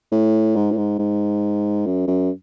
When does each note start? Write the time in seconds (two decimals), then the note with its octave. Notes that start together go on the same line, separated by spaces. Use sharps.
0.12 A2
0.56 G#2
0.72 A2
0.77 G#2
0.99 G#2
1.86 F#2
2.08 F#2